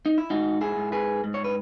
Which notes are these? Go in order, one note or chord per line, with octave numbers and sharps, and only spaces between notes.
D#4
E4
G#2 D#4 F#4
E4 G#4
G#2
G#4 B4
G#2
C#5
B4